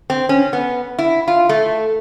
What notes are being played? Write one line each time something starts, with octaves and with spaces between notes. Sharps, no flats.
C4
C#4
B3
E4
F4
A3